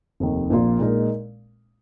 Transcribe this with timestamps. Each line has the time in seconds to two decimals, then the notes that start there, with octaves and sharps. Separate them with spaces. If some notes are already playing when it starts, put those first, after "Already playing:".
0.20 F1 D#2 D#3
0.50 A#1 A#2 A#3 F4
0.79 A#2 G#3 D#4 A#4